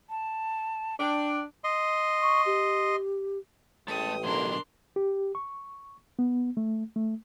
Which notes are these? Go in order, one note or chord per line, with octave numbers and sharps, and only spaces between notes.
A5
D4 G5
D#5 C6
C#6
G4
A1 G#3 A3 A4 G5 D#6
B2 D3 F#3 D4 A#4 C6
G4
C#6
B3
A3
A3